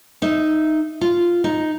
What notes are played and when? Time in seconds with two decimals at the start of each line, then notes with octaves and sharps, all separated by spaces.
0.22 D#4 E5
1.01 F4
1.44 D#4